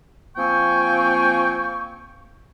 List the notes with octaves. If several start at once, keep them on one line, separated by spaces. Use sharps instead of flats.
F3 A#3 C4 G5 G#5 C#6